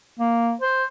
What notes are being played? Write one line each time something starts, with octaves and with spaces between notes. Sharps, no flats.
A#3
C5